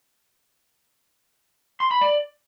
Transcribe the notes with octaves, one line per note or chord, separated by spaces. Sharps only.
C6
B5
D5